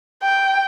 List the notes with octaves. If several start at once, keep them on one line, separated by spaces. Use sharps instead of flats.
G5